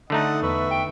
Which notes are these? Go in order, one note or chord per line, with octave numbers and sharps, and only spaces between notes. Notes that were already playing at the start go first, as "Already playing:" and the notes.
D3 A3 D#4 D#5 F#5
E2 B4 E5 C#6
G5